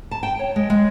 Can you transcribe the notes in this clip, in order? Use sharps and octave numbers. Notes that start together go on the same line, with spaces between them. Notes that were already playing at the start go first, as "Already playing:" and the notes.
A5
G5
C#5
G#3
G#3